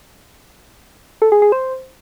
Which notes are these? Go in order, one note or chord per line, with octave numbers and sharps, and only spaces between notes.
A4
G#4
G#4
C5